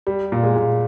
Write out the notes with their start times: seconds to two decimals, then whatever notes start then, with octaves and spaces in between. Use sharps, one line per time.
0.07 G3
0.32 A#2
0.43 G#3
0.56 A#2